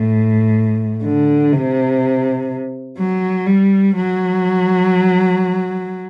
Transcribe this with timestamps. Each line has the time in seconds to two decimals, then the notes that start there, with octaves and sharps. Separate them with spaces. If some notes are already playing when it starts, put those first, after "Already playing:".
Already playing: A2
1.04 D3
1.53 C3
2.99 F#3
3.47 G3
3.96 F#3